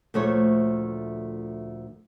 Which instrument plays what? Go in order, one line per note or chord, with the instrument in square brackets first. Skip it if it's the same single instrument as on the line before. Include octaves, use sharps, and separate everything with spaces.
[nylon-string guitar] D2 A#2 F3 A3 C5 C#5